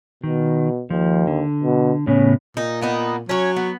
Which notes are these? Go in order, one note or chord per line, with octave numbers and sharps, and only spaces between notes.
B2 D#3
D#2 F3
D3
B2
A2 C#3 B3 C#4
A#2 D#4
A#3 B3 D#4
F#3 C#4 C#5
B3